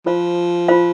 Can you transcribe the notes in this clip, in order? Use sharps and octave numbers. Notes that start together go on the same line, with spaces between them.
F3 F4 C5 F5
F4 C5 F5